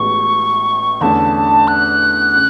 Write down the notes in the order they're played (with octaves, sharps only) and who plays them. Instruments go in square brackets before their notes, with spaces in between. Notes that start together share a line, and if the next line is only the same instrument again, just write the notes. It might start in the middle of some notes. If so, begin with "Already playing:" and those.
Already playing: [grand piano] A1 A2 G#3 B3 F#4 [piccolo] C#6
[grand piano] E2 D3 A3 C#4 [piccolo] A5
[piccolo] F#6
[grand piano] C#3